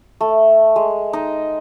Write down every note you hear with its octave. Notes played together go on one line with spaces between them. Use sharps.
A3
G#3
D#4